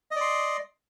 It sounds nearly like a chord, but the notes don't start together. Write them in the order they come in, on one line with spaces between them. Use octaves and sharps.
D#5 D5 C6